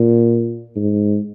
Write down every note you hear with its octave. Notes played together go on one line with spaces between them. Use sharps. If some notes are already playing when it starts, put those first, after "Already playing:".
Already playing: A#2
G#2